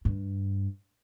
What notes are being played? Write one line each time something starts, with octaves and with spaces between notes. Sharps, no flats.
G2